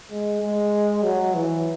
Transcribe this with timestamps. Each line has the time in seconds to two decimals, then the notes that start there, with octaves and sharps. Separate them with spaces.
0.10 G#3
0.41 G#3
1.03 F#3
1.34 E3